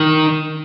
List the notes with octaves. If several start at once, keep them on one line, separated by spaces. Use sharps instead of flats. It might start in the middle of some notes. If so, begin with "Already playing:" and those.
Already playing: D#3